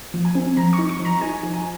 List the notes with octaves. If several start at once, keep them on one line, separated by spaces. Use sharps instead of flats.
F3
G#5
C4
F3 A#5
C#6
D#4
C#6
F3
A#5
D#4 G#5
F3
G#5